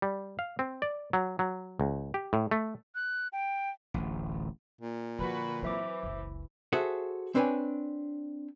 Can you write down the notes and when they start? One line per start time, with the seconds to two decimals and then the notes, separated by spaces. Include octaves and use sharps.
0.02 G3
0.39 F5
0.59 C4
0.82 D5
1.13 F#3
1.39 F#3
1.80 C#2
2.14 G4
2.33 A2
2.51 A3
2.95 F#6
3.32 G5
3.94 D1 A1
4.81 A#2
5.19 D3 F3 F#4 B4
5.63 E3 F#3 C4 C5 E5 D6
6.03 F#1 C#2
6.73 F#4 G#4 A4 C5 E5 F#5
7.35 C4 D4 B4 C#5 G#5